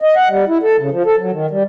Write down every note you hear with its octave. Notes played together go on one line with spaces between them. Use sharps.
D#5
F#5
G3
E4
A4
C#3
F3
A4
F#3
D#3
G3